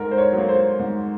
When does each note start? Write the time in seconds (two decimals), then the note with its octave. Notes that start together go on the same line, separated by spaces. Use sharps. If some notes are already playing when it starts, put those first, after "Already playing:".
Already playing: G#2 A#4
0.11 C5
0.18 C#5
0.33 F#3 A#3
0.49 C5
0.79 G#2